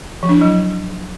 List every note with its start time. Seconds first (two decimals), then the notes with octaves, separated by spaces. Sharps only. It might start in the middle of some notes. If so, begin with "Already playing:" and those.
0.23 F3
0.29 D4
0.35 E4
0.41 F#3